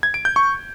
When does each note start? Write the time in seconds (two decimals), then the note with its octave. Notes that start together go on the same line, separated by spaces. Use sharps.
0.03 G#6
0.14 D7
0.25 G6
0.36 C#6